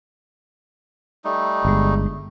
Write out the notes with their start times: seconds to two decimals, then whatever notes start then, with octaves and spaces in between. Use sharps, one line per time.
1.24 G3 A3 D#4
1.65 G1 G#3